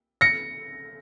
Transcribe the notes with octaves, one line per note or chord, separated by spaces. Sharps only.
A#6 C#7